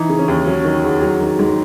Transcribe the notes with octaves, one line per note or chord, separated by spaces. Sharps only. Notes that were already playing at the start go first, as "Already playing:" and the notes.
Already playing: E3 D#4
C#3
C#4
D#2
F#3 C#4
D#3
E2
F#3
D#3
G#2